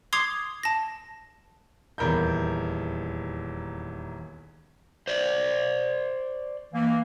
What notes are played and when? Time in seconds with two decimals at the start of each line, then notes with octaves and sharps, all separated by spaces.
0.13 C6 D6 D#6 G#6 C7 F7
0.63 A5 A#6
1.98 D#1 E2 A#4 B5 G6
5.08 C5 D5
6.73 E3 A#3